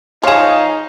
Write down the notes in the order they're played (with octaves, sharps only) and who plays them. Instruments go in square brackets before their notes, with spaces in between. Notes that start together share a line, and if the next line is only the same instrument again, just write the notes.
[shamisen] F3 G#4 [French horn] D#4 [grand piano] C#5 E7 [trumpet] F5